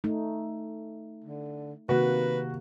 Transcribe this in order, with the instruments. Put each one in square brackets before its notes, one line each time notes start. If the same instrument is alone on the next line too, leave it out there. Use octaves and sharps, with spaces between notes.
[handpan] A3 D#4
[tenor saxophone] D3
[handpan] C3 D#3 A#3 [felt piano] F#4 [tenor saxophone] B4